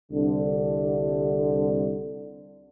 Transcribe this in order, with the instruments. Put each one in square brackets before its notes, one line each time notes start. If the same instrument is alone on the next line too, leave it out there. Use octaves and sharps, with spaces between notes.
[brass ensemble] C2 D3